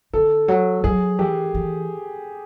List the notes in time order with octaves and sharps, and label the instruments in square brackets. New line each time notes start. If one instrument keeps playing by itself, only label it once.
[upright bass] D3 [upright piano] A4
[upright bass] F#3
[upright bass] F#3 [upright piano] G#4
[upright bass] E3 [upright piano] G4
[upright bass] E3